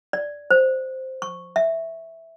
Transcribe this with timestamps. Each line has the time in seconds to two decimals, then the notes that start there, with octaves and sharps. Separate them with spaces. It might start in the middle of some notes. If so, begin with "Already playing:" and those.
0.13 D5
0.51 C5
1.22 C#6
1.56 E5